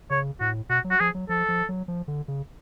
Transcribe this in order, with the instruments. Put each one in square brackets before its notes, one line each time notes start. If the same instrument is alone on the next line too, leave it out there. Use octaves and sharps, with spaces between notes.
[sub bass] C#3 [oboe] C#5
[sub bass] A2 [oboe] F#4
[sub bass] B2 [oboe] F#4
[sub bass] F#3
[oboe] F#4
[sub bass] F3 [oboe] G#4
[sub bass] F#3
[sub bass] F3 [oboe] A4
[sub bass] F3
F#3
F3
D3
C#3